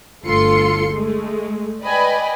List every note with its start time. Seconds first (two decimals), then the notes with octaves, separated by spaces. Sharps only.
0.25 G1 D2 F4 A4 C6 C#7
0.94 G#3 A3
1.82 B4 D5 D#5 G5 G#5 B5